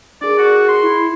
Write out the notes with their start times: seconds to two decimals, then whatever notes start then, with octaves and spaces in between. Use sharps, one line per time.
0.22 D4 G#4 A#4 D5
0.38 F#4
0.68 C6
0.83 E4